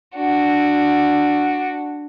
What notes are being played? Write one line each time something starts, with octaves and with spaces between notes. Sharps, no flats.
D4 F#4